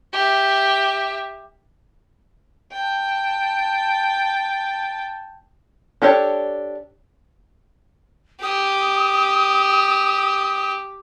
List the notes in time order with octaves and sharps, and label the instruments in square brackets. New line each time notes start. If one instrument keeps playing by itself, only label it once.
[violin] G4 E5
[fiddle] G5 A5
[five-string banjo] D4 G4 A4 C#5
[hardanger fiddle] G4 [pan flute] D#6